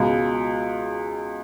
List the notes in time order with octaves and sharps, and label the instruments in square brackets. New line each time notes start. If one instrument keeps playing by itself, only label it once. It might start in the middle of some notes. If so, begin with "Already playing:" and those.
Already playing: [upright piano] C#2 B2 G#3